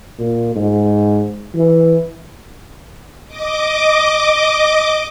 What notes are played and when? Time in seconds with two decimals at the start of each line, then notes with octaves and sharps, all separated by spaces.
0.19 A#2
0.56 G#2
1.55 E3
3.27 D#5 D6